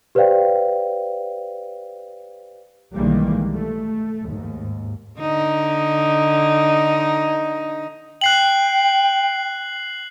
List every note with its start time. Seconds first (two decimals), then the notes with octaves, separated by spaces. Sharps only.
0.15 G4 B4 C5 D5 F5 G5
2.96 B1 D#3 E3 G3 G#3 A#3
3.54 A3
4.26 D#2 G#2
5.20 D3 D#4
8.21 G5 F#6 C7 F#7